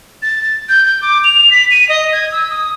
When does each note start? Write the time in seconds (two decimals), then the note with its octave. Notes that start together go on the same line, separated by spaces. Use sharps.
0.22 A6
0.69 G6
0.85 G6
1.02 D6
1.24 F7
1.51 B6
1.71 D#7
1.89 D#5
2.13 G#6
2.32 E6
2.50 D#6